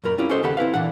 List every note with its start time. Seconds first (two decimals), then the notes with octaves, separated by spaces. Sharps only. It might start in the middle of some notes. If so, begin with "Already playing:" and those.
0.04 F#2 A#2 A#4 B5
0.18 C4 C#4 E4 F4 G4
0.29 C#4 F#4 A4 C5 D#5
0.43 D#2 C#3 G4 A4 F#5 B5
0.57 C4 E4 B4 F5
0.74 A#2 E3 D4 F#5